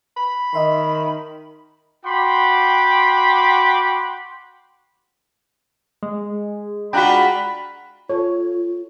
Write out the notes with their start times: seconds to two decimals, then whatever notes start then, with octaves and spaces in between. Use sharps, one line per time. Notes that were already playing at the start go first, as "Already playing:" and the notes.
0.17 B5
0.54 D#3 D#5 E5 C6
2.04 F#4 G5 B5 C6 D6
6.03 G#3
6.93 D4 F4 F#4 G5 A#5 B5 F#6
8.10 F4 A4 C#5